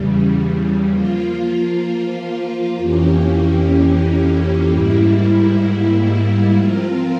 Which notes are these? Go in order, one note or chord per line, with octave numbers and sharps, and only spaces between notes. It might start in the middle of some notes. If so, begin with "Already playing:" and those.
Already playing: E2 C#3 G3
F3 A#3 F4
F2 E3 A#3 C#4 G4
G#2 G3 A#3 E4
F3 C4 F4 A#4